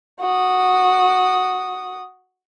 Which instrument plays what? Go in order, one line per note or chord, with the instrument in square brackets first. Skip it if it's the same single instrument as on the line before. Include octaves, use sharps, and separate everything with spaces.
[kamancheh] F#4 D#6